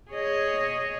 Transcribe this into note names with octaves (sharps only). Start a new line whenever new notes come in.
G#4 C#5 D#5